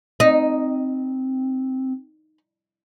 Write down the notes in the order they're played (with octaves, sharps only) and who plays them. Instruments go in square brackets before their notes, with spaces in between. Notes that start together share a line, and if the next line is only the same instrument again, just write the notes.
[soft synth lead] C4 [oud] D#4